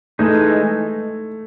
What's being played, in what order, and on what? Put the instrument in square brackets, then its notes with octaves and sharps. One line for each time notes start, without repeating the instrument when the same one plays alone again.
[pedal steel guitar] E3 G#3 D#4 [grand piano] A3